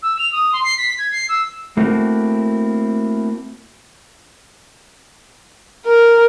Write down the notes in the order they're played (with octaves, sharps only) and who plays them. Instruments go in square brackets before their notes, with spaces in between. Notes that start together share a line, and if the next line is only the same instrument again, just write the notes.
[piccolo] E6
F7
D#6
C6
C7
B6
G#6
C7
E6
[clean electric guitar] A3 A#3 C4 E4 F#4
[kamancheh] A#4